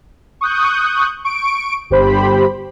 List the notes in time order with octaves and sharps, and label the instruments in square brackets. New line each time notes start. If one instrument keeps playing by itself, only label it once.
[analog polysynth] C#6 D#6 F#6 G6
C#6 D7
G1 G4 C5 B5